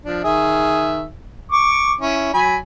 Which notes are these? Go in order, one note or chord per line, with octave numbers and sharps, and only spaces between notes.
F3 D4
D#3 G#4 E5
C#6 D6
C#4 E4 C#5
F#3 G#5 B5